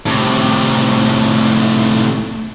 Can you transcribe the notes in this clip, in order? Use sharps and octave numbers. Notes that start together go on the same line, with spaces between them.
A2 C3